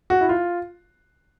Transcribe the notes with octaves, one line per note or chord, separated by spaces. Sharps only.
F#4
E4
F4